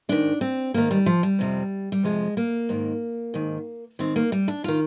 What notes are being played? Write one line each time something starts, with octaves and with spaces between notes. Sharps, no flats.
G#2 D#3 D4
C4
G#2 D#3 A#3
G3
F3
G3
F2 C3 F3
G3
F2 C3 F3 G#3
A#3
G#2 D#3
G#2 D#3
G#2 D#3 C4
A#3
G3
D4
D#3 F4